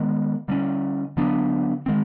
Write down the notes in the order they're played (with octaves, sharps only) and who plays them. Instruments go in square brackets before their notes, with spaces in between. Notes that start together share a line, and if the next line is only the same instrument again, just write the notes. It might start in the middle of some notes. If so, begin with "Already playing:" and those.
Already playing: [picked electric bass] D#3 G#3 B3
D3 G3 A#3 C#4
D3 F#3 B3 D4
D#3 G#3 C4